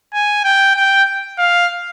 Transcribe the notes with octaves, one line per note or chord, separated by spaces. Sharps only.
G#5
G5
G5
F5